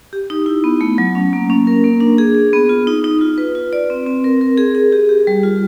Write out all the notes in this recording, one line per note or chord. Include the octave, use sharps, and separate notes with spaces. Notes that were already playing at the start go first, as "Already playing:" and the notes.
G4
D#4
E4
B3
A3
F#3
C#4
A#3
C#4
A#4
A#3
D4
G#4
G#4
B3
F4
D#4
D#4
F4
B4
F4
D5
C4
C4
A#4
A#4
G#4
G#4
G4
G4
G3
F4